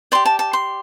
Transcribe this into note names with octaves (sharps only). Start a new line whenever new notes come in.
G4 D5 C6
A5
A5
C6